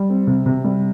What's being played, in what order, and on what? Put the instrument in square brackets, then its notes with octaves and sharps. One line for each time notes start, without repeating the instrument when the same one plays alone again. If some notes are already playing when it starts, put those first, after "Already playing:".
Already playing: [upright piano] G3
C4
C3
C3
G3